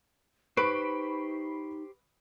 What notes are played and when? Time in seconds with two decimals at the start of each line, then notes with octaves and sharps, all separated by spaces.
0.57 D#4 G4 B4 C5 B5 C#6 D7